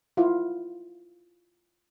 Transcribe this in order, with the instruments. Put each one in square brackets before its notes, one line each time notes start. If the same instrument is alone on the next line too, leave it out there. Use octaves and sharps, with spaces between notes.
[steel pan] E4 F4 F#5